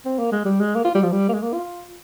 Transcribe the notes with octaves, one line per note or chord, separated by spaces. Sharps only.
C4
A#3
G#3
G3
G#3
A#3
F4
G3
F3
G3
A#3
G#3
A#3
F4